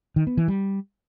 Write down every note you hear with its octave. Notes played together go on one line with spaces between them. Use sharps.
D#3
B3
E3
G3